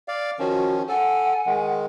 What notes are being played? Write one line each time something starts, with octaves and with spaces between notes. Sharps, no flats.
D5 F5
D#3 F3 C#4 F#4
A4 F#5 G#5
D#3 G#3